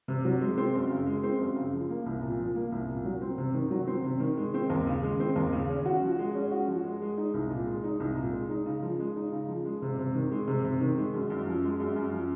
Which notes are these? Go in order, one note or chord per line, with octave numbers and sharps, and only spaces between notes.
C3
F#3
G#3
C4
F#2
C#3
G#3
C4
F#2
C#3
F3
A#3
C2
A#2
F3
A#3
C2
A#2
F#3
C4
C3
D#3
F#3
C4
C3
D#3
G#3
C4
D#2
C#3
G#3
C4
D#2
C#3
C#4
F#4
F3
G#3
C#4
F#4
F3
G#3
G#3
D#4
C2
A#2
G#3
D#4
C2
A#2
G#3
D#4
C#3
F3
G#3
D#4
C#3
F3
G#3
C3
C3
D#3
G#3
C3
C3
D#3
G#3
F#2
F#2
F3
G#3
F#2
F#2
F3